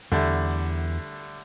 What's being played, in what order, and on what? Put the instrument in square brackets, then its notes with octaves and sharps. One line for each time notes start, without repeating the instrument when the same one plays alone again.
[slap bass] E2 [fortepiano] D3 G3 A3